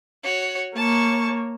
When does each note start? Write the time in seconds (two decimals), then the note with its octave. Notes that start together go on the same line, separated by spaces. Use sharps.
0.23 F#4 C#5
0.76 A#3 C#5 A5 C#6